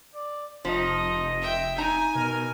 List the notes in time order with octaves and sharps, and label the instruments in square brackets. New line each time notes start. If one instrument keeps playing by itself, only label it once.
[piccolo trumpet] D5
[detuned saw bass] F1 [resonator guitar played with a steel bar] F3 [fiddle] D#4 [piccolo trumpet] D#5
[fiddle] E5 G5
[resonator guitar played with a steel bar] D#4 A#5 [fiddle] G#5
[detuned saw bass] B2 [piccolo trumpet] A#4